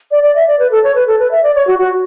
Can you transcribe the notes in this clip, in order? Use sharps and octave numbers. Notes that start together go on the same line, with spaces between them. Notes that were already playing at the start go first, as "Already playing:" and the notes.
D5
D5
E5
D5
B4
A4
C#5
B4
A4
B4
E5
D5
C#5
F#4
F#4